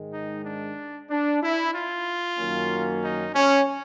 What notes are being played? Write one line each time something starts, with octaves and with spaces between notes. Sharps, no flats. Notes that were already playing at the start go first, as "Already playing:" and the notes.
Already playing: G#2 D#3 G#3
D#4
D4
D4
E4
F4
F#2 D#3 F#3 A#3 C#4
D#4
C#4